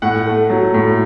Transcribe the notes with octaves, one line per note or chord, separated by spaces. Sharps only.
A2 F#5
A3
F#3
A2